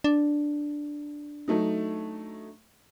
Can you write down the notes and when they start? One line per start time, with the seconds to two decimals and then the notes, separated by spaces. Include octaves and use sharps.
0.04 D4
1.48 F#3 A3 D#4